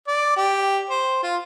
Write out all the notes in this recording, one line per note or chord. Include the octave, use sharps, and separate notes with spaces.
D5
G4
C5
F4